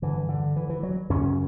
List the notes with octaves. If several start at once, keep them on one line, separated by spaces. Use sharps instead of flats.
G2 D3 E3
D3
E3
E3
F#3
F#2 C#3 C#4